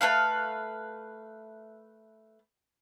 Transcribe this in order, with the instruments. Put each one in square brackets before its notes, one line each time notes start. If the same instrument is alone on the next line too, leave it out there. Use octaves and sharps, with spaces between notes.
[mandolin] A3 C#4 B4 F5